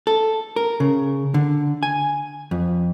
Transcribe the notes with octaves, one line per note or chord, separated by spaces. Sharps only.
A4
A#4
C#3
D3
G#5
F2